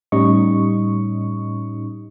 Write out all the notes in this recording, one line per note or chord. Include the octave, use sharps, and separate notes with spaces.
A2 G3 C#4 D#4 D#5 C#6